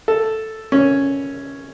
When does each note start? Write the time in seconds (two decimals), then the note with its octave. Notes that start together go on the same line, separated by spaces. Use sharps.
0.08 A4
0.72 C#4